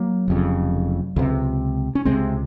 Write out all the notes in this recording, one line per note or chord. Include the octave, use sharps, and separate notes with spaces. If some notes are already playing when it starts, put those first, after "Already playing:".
Already playing: F#3 A#3
F1 F2 C#3
C#2 C3
C#4
C#2 C3 G#3 C4